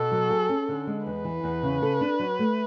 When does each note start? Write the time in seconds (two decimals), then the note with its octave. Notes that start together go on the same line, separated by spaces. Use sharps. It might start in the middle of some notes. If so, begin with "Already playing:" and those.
Already playing: B2 A4
0.12 F#3
0.30 G#4
0.49 C#4
0.69 D3
0.87 G#3
1.06 E2 B4
1.25 E3
1.44 E2
1.63 C#3
1.82 A4
2.01 D4
2.19 F#3
2.39 A3